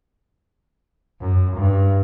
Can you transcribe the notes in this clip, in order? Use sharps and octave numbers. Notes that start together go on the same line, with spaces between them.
F#2
G2